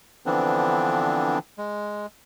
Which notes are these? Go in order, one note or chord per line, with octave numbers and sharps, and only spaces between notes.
D3 E3 F3 B3 C4 D4
G#3